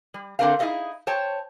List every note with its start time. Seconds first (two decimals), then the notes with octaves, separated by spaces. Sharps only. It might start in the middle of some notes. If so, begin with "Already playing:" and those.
0.14 G3
0.39 D3 A3 C4 A#4 C5 F5
0.59 D#4 E4 G#4 A4 D#5 F5
1.07 C5 C#5 G5 A5